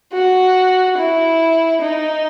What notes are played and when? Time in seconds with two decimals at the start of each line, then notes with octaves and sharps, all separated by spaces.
0.13 F#4
0.97 E4
1.81 D#4